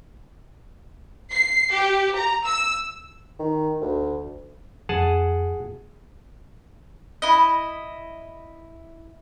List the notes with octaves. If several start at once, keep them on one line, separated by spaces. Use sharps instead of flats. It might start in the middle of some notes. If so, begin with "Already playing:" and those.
C7
G4
A#5
E6
D#3
D2
F2 G#4 F#5 A5
E4 D#5